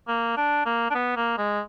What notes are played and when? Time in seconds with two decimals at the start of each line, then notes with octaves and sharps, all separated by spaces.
0.08 A#3
0.37 D4
0.66 A#3
0.91 D4
0.95 B3
1.16 A#3
1.38 G#3